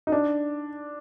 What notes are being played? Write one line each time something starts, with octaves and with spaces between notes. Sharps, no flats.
D#4
D4